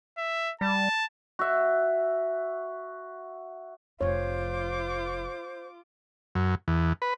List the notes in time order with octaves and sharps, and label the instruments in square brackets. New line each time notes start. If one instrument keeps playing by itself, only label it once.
[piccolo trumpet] E5
[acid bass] G3 [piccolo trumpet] A5
[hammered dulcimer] F#4 E5
[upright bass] F1 F2 [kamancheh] F4 D6 [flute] C5 [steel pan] C#5
[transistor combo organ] F#2
E2
B4